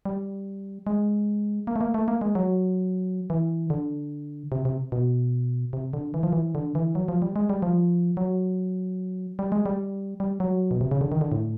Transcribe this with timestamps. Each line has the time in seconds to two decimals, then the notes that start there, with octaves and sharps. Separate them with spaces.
0.05 G3
0.87 G#3
1.67 A#3
1.76 A3
1.81 A#3
1.94 A3
2.08 A#3
2.21 G#3
2.35 F#3
3.30 E3
3.70 D3
4.52 C3
4.65 C3
4.92 B2
5.73 C3
5.93 D3
6.14 E3
6.23 F3
6.33 E3
6.55 D3
6.75 E3
6.95 F#3
7.08 F3
7.22 G3
7.36 G#3
7.50 G3
7.62 F3
8.17 F#3
9.39 G3
9.52 G#3
9.66 G3
10.20 G3
10.40 F#3
10.71 B2
10.81 C3
10.91 C#3
11.01 D3
11.12 D#3
11.21 D3
11.32 A2